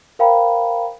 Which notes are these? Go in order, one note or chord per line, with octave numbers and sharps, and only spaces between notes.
A#4 C5 F5 G5 A#5 B5